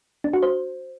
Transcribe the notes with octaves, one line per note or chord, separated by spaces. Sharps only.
D4
F#4
C5